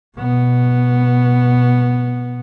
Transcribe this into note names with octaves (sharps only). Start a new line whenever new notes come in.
B2 B3